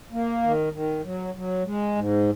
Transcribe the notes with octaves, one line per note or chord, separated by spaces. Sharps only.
A#3
D#3
D#3
F#3
F#3
G#3
G#2